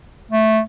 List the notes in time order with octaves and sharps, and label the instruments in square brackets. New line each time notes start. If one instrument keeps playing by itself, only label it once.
[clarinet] A3